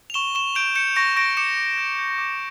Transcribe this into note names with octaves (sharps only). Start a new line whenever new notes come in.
F7
C#6 E7 G7
C#6 E7 G7
G6 D7 F7
G6 C#7 E7
C#6 A#6 D7
C#6 A#6 D7
D6 C#7 E7
D6
G6
G6
D6